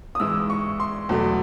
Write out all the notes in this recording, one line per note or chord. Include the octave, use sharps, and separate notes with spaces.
D#6
G#2 E3 G#3 E6
C#6
C6
E2 B2 F#3 A3